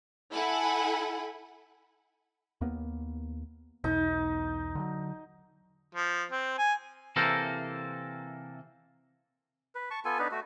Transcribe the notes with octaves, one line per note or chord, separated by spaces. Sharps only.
E4 A4 F#5 G#5 B5
D#2 A#3 B3
B1 E2 B2 D#4
D3 E3 F#3
F3
C4
G#5
C3 E3 A#3 A4 A#4 C5
B4
A5 C#6
B3 F4 A4 G#5
B3 D4 D#4 B4
A3 F#4